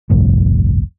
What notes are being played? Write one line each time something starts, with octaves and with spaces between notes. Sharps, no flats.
G1 C2 F2 A2